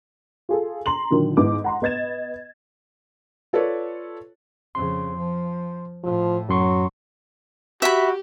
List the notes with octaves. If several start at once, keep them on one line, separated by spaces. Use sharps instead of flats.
F4 G#4 A4
A#5 C6 F#7
A#2 D3 D#3 F#3
G#2 B3 E4 D6
F#5 A#5 C6
B3 D#5 G#6 A6 E7
F4 A4 B4 C#5 D5
F2 C#3 C6
F3
A2 F3
F#2 F#3 C6 C#6
F#4 G4 E5 B5